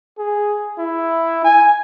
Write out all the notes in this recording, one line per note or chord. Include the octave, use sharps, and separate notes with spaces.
G#4
E4
G#5